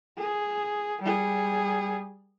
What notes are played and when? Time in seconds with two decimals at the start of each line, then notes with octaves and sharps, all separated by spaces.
0.17 G#4
1.02 G3 G#4